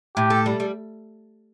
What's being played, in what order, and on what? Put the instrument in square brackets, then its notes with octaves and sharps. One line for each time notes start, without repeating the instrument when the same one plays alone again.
[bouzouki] A2 [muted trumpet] G4
[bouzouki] A4
G3
G3